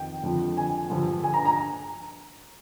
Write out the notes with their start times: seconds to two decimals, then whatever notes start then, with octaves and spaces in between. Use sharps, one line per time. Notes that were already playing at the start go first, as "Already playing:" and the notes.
Already playing: F2 D#3 G5
0.23 F2 D3 F3
0.57 G#5
0.90 G2 D3 F3
1.24 G#5
1.34 A#5
1.45 A#5